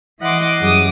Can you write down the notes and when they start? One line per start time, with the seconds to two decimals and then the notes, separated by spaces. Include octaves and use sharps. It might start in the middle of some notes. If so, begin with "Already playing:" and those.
0.19 E3 E4 D#5 F#5 C6 D6
0.59 F#2 G3 G#4 D6 D#6